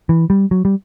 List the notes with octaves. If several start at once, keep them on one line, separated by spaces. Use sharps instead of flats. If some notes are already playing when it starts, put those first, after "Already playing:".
E3
G3
F#3
G3